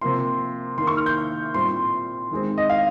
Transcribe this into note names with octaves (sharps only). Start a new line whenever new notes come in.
C3 F3 A#3 C6
D#3 A#3 C6
C#6
F6
G6
A#2 G3 C4 C6
D#3 G#3 C4
D#5
F5